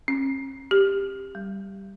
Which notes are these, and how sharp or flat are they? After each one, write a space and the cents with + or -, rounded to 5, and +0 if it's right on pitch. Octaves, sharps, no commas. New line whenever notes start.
C#4 -45
G4 +10
G3 -5